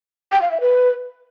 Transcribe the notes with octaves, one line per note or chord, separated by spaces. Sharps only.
G5
F5
E5
B4